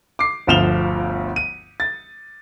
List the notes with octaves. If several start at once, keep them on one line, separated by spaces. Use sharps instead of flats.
D6 C7
G1 D2 F3 E7 F7 G7
D#7
A6